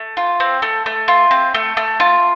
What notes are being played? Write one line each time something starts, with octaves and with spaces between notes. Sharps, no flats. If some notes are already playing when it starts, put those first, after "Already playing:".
Already playing: A3
F4
C4
A3
A3
F4
C4
A3
A3
F4